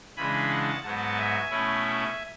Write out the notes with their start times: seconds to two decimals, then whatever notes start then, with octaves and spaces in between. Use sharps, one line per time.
0.17 C#3 E3 G#3 D4 G#5 B5
0.50 F#5 A5
0.83 G#2 F#3 B3 F#5 A5
1.17 E5 G#5
1.51 B2 A3 C#4 E4